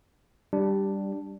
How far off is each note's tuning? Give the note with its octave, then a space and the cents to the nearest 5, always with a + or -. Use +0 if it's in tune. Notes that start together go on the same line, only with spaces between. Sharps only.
G3 +0 D4 +0 G4 -5